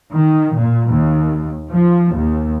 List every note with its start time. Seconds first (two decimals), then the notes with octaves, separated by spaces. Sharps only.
0.12 D#3
0.57 A#2
0.90 D#2
1.73 F3
2.15 D#2